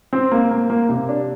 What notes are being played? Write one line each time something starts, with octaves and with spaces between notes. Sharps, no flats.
C4
A#3
A#3
A#3
C3
D4